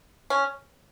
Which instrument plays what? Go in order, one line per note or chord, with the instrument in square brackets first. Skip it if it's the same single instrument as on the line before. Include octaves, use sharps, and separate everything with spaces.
[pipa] C#4